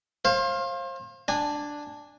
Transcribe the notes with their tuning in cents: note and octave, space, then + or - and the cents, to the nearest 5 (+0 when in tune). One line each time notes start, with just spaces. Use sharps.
C5 +35 F5 +0
D4 +0 G#5 -20